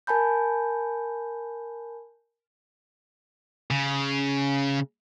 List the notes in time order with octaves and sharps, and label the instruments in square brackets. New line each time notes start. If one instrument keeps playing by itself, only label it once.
[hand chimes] A#4 G#5 A5 B5 G6
[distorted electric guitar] C#3